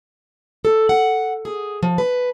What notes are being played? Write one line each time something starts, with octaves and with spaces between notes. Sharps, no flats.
A4
F#5
G#4
F3
B4